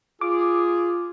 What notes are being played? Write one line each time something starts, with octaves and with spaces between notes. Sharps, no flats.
F4 G#4 D6